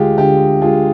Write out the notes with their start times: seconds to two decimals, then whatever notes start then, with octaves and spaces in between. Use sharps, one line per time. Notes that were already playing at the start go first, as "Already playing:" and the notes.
Already playing: D2 G#3 F4 G4 G#4
0.18 D3 G4
0.62 G#3 F4 G#4